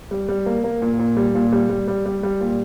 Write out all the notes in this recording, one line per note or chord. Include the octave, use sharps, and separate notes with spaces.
G3
G3
A#3
A#3
A#2
A#2
G3
A#2
G3
G3
G3
G3
G3
A#2